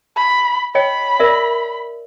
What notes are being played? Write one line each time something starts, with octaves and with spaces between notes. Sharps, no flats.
B5
C#5 D#5 G5 B5
A#4 D5 E5